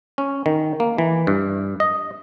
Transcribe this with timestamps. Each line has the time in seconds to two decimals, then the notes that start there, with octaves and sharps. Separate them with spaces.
0.18 C#4
0.46 D#3
0.80 A#3
0.98 E3
1.27 G2
1.80 D#5